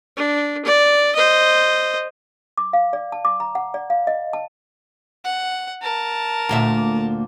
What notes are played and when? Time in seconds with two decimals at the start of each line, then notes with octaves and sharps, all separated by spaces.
0.17 D4
0.65 D5
1.15 C5 D#5
2.57 D6
2.73 F5
2.93 D5
3.12 A5
3.25 D6
3.40 A#5
3.55 F#5
3.74 D5
3.90 F5
4.07 D#5
4.33 A5
5.24 F#5
5.82 A#4 A5
6.49 D2 A#2 E5